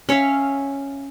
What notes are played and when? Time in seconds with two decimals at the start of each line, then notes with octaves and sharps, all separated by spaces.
0.09 C#4 C#5 E5 F5